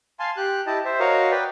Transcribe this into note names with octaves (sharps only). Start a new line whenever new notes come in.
F5 G#5 A5 C6
G4 F#6
E4 G4 D#5 A5
C5 E5
F#4 A#4 C#5 D#5 F5
B4 D5 G5